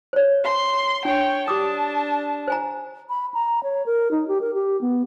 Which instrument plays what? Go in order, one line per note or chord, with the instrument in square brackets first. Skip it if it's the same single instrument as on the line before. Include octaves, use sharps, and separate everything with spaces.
[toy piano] C5 C#5
[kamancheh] C6
[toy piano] D4 [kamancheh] C#5 G5
[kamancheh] D4 A5 [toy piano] G4 D6 D#6
[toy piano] C5 G#5 A#5
[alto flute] B5
A#5
C#5
A#4
D#4
G4
A#4
G4
B3